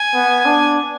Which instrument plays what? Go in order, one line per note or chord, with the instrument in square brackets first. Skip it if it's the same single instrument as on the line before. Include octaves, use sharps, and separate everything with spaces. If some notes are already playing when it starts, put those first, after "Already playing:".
Already playing: [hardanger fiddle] G#5
[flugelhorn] B3
D4